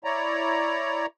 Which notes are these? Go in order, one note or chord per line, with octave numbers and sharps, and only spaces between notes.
E4 C#5 D5 A#5